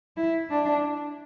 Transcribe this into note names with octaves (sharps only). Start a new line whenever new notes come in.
E4
D4